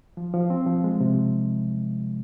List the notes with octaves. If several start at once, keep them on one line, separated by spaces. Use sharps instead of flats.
F3
F3
C4
F3
G#3
C3